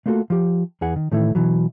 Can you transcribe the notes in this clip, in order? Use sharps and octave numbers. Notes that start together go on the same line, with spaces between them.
A3 A#3 F4 F#4 G#4 A4
F3 G4
E2 E3 G#4 F#5
D#3
A2 D#3 E3 A3 E4
B2 E3 F#3